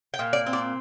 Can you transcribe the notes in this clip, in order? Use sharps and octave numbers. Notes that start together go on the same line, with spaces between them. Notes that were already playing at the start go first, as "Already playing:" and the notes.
G5
A#2
D5
C4
D5